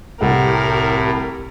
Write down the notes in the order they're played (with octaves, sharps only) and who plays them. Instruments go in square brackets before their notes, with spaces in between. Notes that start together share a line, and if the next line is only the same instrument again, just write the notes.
[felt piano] C2 A4 F#5 [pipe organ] A2 [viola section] G4 [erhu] A#4